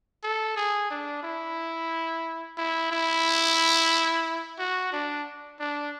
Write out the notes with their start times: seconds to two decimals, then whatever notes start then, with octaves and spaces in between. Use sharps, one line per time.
0.23 A4
0.56 G#4
0.90 D4
1.23 E4
2.57 E4
2.91 E4
4.59 F#4
4.92 D4
5.60 D4